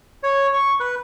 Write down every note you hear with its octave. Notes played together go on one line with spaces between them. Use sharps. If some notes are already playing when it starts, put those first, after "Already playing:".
C#5
C#6
B4